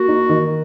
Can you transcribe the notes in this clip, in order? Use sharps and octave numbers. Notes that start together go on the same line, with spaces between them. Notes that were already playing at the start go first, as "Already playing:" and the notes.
Already playing: A#3 F#4
D#4
D#3